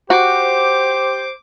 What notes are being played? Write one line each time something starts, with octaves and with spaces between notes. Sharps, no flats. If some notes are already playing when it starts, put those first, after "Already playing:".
F#4 G4 C5 D6